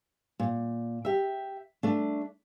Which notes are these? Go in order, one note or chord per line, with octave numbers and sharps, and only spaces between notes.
A#2
G4 E5
A3 D4